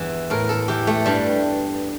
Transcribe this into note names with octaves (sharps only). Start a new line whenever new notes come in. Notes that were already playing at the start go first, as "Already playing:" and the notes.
Already playing: E2 G2 E3
A2 A#4
A4
E3 G4
A3
G2 G3